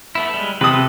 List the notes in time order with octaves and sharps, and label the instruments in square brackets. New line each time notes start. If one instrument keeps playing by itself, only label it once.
[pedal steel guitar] A3 B3 E4
G3 G#3
[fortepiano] C3 D#6 [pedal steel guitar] A4 B4